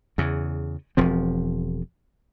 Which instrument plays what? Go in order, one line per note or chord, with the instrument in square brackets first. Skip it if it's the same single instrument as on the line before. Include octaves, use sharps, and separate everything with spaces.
[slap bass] E2 C#3
E1 F3 C4